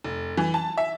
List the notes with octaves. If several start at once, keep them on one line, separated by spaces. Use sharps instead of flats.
F1
E3
A5
E5